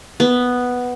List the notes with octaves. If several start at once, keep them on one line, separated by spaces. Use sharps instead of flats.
B3